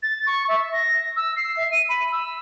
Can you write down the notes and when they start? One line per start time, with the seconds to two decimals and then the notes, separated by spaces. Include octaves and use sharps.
0.02 A6
0.26 C#6
0.48 E5
0.72 A#6
1.16 E6
1.36 C7
1.56 E5
1.71 D#7
1.89 B5
2.12 E6